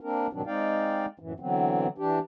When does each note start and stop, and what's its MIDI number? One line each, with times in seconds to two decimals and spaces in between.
0.01 0.27 58
0.01 0.27 60
0.01 0.27 62
0.01 0.27 70
0.33 0.42 44
0.33 0.42 47
0.33 0.42 51
0.33 0.42 54
0.33 0.42 60
0.33 0.42 62
0.46 1.06 56
0.46 1.06 60
0.46 1.06 63
0.46 1.06 74
0.46 1.06 77
0.46 1.06 79
1.19 1.33 42
1.19 1.33 45
1.19 1.33 52
1.40 1.87 50
1.40 1.87 52
1.40 1.87 54
1.40 1.87 59
1.40 1.87 60
1.98 2.19 52
1.98 2.19 62
1.98 2.19 67